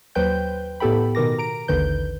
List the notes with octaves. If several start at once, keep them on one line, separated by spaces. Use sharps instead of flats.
D#2 F#3 B4 C5 G5 G6
A2 B3 G4 A4 G5 B5
B2 D#3 A#4 D6 A#6
A#5 D7
A1 D#2 D3 D#3 B4 G6